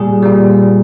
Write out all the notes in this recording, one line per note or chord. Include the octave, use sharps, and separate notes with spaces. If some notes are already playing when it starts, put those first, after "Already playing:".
Already playing: A#2 G3 G#4
A#2 G3